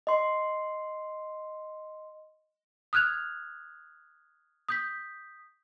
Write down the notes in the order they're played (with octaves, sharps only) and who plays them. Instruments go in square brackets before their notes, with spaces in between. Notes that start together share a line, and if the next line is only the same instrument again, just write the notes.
[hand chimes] D#5 C6
[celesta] D#6 F6 F#6 G#6 F7
D#6 G6 B6